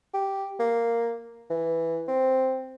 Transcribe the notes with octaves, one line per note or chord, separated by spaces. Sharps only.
G4
A#3
E3
C4